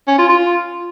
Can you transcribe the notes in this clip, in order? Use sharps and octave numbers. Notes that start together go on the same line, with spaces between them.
C#4
F4
F4